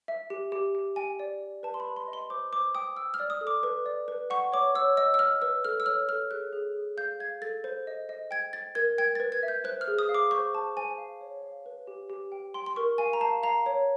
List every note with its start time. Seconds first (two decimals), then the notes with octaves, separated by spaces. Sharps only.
0.08 E5
0.30 G4
0.52 G4
0.75 G4
0.96 G5 G#5
1.20 D5
1.41 D5
1.63 B4 A5
1.74 C6
1.80 B5
1.86 B4
1.96 C6
2.08 D#5
2.13 C6
2.30 C5 D6
2.53 C5 D6
2.75 G5 D#6
2.97 G5 E6
3.14 F6
3.20 D5
3.30 D#6
3.41 A4
3.47 D6
3.63 B4
3.86 D5
4.08 B4
4.30 F#5 C#6
4.52 C#5 D6
4.75 C#5 E6
4.97 D#5 E6
5.14 E6
5.19 D#5 F6
5.42 B4 E6
5.65 A4 F6
5.80 E6
5.86 C#5 F6
6.08 A4 F6
6.31 G#4 F#6
6.53 G#4
6.76 G#4
6.97 F5 G6
7.20 F5 G#6
7.42 A4 A6
7.64 C5
7.87 D#5
8.09 D#5
8.31 G5 G#6
8.53 G5 A6
8.75 A#4 G#6
8.98 G5 G#6
9.15 B4 A6
9.32 G#6
9.43 E5
9.48 G6
9.64 C5 F#6
9.81 F6
9.88 G#4
9.99 D#6
10.09 F5
10.15 D6
10.31 C5 C#6
10.53 C5 A5
10.77 C5 G#5
10.98 F5
11.21 C#5
11.42 F5
11.66 B4
11.87 G4
12.10 G4
12.32 G5
12.54 G5 C6
12.66 C6
12.76 A#4 C#6
12.98 F5 G#5
13.13 A#5
13.21 F5 A5
13.43 F5 A#5
13.66 C#5